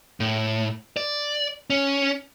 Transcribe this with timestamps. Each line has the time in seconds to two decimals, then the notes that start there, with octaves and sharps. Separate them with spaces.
0.20 A2
0.97 D5
1.70 C#4